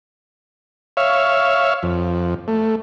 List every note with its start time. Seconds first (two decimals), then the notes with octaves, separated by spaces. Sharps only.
0.97 C#5 E5 F5
1.83 F2
2.48 A3